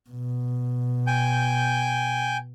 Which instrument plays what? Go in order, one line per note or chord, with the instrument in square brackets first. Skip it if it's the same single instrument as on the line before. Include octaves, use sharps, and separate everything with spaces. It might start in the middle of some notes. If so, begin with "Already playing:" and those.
[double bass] B2
[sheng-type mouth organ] G5 G#5 G6